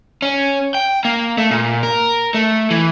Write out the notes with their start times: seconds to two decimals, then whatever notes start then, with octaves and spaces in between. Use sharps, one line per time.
0.22 C#4
0.74 G5
1.05 A#3
1.38 A3
1.51 A#2
1.83 A#4
2.34 A3
2.70 E3